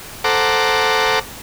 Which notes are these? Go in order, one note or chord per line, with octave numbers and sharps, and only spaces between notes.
A4 C5 F#5 A#5 D6